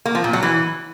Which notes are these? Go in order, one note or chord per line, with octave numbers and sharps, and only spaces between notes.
A#3
F3
A#2
F#3
E3